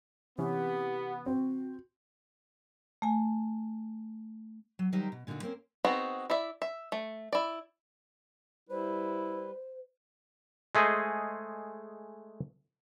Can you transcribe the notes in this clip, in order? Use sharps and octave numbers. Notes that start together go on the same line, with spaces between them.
C3 E3 B3 C#4 G4
C4 F#4
A3 G#5
F#3
D#3 F#3 G3 D#4 G4 C5
B2
A#2 D3 D4 D#4 F#4
A#3 C4 C#4 C5
B3 C4 D#4 F#4 G#4
E4 D5 E5
E5
A3
E4 D5
G3 E4 B4 C5
G#3 A3 G#4 C5 D#5